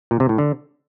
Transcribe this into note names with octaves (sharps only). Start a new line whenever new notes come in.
A#2
C3
A2
D3